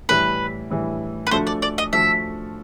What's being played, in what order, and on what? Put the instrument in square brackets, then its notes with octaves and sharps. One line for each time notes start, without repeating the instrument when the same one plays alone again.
[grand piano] A2 E3 G3 [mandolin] B4
[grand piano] A2 E3 G3
[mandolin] B4
[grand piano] F3 A3 D4 F#4 A4 [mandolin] C5
[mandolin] D5
D5
D#5
[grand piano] F3 A3 D4 F#4 A4 [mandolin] E5